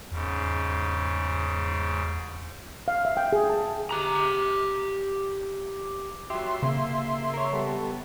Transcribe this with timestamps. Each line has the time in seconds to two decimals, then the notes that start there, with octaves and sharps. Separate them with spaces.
0.12 E2 G#2 C#3
2.88 F5
3.05 E5
3.17 G5
3.33 G#4
3.50 A5
3.91 G4 A#5
6.30 F#3 G4 E5 C6
6.63 C#3 A#3
7.34 A#4 C#5
7.53 G3 B3 A4